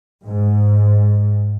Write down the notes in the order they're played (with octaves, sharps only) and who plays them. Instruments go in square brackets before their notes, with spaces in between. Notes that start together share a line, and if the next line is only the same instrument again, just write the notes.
[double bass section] G#2